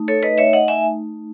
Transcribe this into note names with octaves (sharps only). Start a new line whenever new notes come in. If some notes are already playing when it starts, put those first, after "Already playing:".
Already playing: A3 D#4
A4 C#5
B4 D#5
C#5 E5
D#5 F#5
E5 G#5